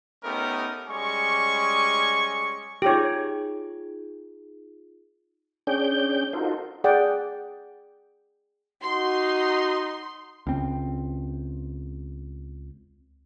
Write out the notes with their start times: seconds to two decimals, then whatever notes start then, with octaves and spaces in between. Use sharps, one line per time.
0.23 A3 B3 C#4 D#4 G4 A#4
0.89 G3 G#3 C#4 G#5 C#6
2.82 D#4 F4 G4 G#4 C#5
5.67 C#4 D4 G#4 G5 G6
6.33 D#4 F4 F#4 A4 A#4 C5
6.84 G#4 D5 F#5 G5
8.83 D#4 F#4 C6
10.47 C#2 C4